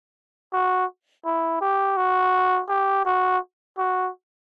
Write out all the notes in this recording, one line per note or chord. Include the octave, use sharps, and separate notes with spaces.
F#4
E4
G4
F#4
G4
F#4
F#4